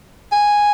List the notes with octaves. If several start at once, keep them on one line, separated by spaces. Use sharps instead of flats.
G#5